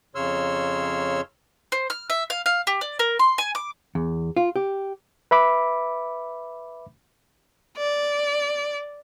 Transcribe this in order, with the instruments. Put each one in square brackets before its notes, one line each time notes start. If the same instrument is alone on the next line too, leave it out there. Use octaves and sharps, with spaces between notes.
[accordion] F2 C#3 C#5 C6 E6 F6
[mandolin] C5
F6
E5
F5
F5
G4
D5
A#4
C6
G#5
D6
[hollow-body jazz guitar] E2
F4
G4
[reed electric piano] B4 E5 B5 D6
[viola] D5